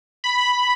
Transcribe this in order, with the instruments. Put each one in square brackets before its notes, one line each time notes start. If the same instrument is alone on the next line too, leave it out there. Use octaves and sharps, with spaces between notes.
[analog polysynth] B5